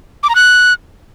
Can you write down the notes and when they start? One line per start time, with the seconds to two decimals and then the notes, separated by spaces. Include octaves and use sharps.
0.23 D6
0.29 A#5
0.35 F#6